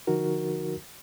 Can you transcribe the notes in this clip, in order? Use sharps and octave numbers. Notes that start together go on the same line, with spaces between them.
D3 F3 D#4 F#4 A#4